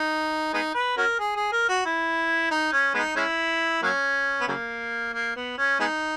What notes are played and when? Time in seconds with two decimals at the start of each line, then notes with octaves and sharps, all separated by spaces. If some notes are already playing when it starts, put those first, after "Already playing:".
Already playing: D#4
0.54 G#3 B3 D#4
0.75 B4
0.97 C#4 F#4 A#4
1.19 G#4
1.36 G#4
1.52 A#4
1.69 F#4
1.85 E4
2.51 D#4
2.73 C#4
2.95 G#3 B3 D#4
3.16 G#3 C#4 E4
3.83 F#3 A#3 C#4
4.41 B3
4.48 C#3 F#3 A#3
5.14 A#3
5.36 B3
5.58 C#4
5.80 G#3 B3 D#4